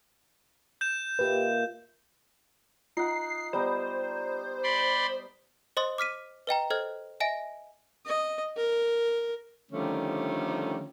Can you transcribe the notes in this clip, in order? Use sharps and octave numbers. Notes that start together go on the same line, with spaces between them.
G6 E7
A#2 G4 B4 D#5 E5
D#4 F4 F#5 C7
G3 B3 C5 A#5
D5 B5 C6
C5 D#5 C6 D#6 A6
D6 F6 B6 D#7
B4 D#5 G5 A#5
A4 C5 D#5 F6 G#6
D#5 E5 G#5 A#6 D7
D#5
A#4
D3 D#3 F3 G3 A3 C#4